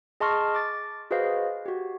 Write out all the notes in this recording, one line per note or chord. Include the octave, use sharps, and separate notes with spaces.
G#4 D#5 A5 C6 C#6 F6
D6 A6
F#4 G#4 B4 C5 D#5 F5
F#4 G4